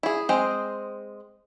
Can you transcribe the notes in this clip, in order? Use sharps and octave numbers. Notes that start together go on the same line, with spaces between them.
E4 G#4
G#3 C4 C5 D#5